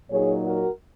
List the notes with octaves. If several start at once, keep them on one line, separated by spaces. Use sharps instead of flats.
A#2 F#3 D#4 G#4 C#5
F#4 A#4